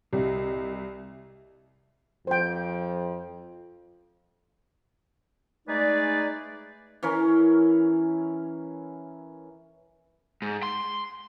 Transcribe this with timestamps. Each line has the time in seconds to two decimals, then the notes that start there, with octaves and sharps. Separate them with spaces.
0.13 C2 G4 D#5
2.27 F2 C5 G5
5.68 G#3 A3 D#4 G#4 B4 D5
7.03 E3 C#4 A#4
10.42 G#2
10.63 C6